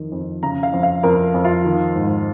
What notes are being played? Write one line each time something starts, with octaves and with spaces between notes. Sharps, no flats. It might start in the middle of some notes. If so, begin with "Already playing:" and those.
Already playing: F2 D#3
F2
C#3 A#5
F5
F2
F5
F2 A#4
F2
F4
D#3
G#2